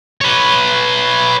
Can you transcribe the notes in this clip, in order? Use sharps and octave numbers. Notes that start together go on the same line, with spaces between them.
B4 C#5